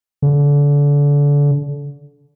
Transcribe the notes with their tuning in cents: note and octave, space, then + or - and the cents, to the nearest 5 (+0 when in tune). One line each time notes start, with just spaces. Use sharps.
D3 -30